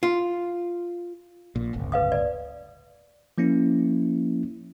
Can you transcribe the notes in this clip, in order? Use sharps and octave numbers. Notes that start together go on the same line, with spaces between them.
F4
A#1 A#2
D1 G1 C#2
B4 F5 D#6
D5
F3 A#3 C#4 E4